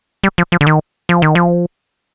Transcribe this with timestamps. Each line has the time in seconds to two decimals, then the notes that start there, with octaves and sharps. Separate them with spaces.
0.24 G3
0.38 F3
0.52 F3
0.61 D3
0.67 D#3
1.09 F3
1.22 D#3
1.35 F3